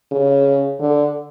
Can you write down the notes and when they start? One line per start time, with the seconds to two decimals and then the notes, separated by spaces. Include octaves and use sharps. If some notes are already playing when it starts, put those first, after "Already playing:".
0.12 C#3
0.80 D3